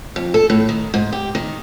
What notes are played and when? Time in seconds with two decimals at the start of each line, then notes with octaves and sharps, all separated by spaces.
0.16 F2
0.34 A4
0.50 A2
0.69 D#3
0.94 G#2
1.12 G4
1.35 D#3